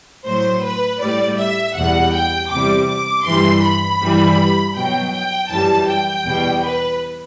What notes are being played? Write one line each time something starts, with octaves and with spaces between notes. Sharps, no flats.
A2 F#3 C5
B4
A2 G3 D5
E5
E2 B2 G3 F#5
G5
E2 C3 G3 D6
D6
G2 E3 G3 C6
B5
G2 E3 G3
B2 F#3 G5
G5
F#2 E3 G3 A5
G5
E2 B2 G3
B4